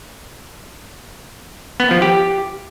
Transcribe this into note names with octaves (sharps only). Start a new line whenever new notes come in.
B3
F3
G4